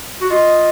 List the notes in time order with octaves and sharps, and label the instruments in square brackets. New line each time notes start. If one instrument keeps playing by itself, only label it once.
[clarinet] F#4
[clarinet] F4 [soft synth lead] D#5